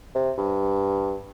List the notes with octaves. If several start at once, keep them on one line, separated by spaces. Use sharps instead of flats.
C3
G2